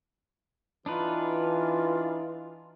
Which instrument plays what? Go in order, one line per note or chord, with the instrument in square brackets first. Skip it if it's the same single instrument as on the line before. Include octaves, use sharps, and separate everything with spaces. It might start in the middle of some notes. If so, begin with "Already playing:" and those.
[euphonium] E3 [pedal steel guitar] D4 D#4 B4 [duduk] F4